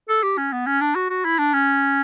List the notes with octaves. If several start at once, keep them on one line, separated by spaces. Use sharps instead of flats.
A4
G4
C#4
B3
C#4
D4
F#4
F#4
E4
D4
C#4